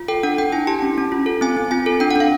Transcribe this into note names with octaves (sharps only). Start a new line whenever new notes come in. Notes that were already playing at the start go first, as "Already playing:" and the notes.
Already playing: F4
A4 G5
D4 F#5
D4 G5
E4 G#5
G4 A5
C#4
C#4
F4
A4
C4 G#5
C4
F4 G#5
A4
D4 G5
F#5
D4 F5